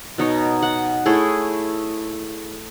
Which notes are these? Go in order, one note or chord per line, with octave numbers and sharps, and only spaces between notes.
B2 D#4 C#5
F#5
A3 E4 G#4 C#5